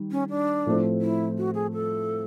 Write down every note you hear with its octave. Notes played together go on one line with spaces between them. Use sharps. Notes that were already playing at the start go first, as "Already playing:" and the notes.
Already playing: D#3 G3
C#4
D4
A2 F3 A3 C4
E4
F#4
G#4
A4